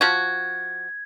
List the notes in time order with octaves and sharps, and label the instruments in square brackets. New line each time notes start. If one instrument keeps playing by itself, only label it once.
[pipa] F3 F#4 [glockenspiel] G#6